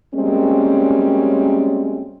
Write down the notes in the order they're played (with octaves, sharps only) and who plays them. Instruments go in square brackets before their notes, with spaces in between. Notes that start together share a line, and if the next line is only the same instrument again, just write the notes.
[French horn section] F#2 G3 G#3 A#3 C4 C#4